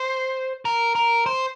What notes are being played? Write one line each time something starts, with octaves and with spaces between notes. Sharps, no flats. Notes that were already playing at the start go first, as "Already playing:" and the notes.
Already playing: C5
A#4
A#4
C5